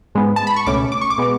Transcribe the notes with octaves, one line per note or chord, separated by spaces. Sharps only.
G#2 G#3 B3
A5
B5
C#6
C#2 B2 A3 C#4 D6
D6
C#6
D6
B2 G#3 B3